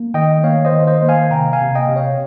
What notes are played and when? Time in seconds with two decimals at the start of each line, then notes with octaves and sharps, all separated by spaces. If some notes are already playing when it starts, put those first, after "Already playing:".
Already playing: A#3
0.14 D#3 D#5 G5
0.44 A#3 C#5 F5
0.65 C5 D#5
0.72 D#3
0.87 C5 D#5
1.02 A#3
1.09 F5 G#5
1.31 C3 G5 A#5
1.53 F5 G#5
1.61 C3
1.75 D#5 G5
1.89 C3
1.96 C#5 F5